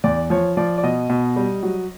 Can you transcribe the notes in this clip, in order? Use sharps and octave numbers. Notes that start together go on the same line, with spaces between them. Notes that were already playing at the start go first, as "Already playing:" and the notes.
E2 D5
F3 C#5
F3 D5
D5
B2 D#5
B2
G3
F#3